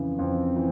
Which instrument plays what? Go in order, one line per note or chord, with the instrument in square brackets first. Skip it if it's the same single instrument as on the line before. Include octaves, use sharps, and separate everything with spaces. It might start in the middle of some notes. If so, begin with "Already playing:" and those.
Already playing: [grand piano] F2 C#3 E3
[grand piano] F2 [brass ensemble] C4
[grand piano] E3